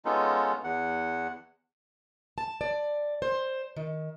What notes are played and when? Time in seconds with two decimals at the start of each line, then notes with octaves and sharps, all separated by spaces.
0.05 G#3 B3 C#4 D#4 F4 A4
0.64 E2 F#5
2.38 A5
2.61 D5
3.22 C5
3.76 D#3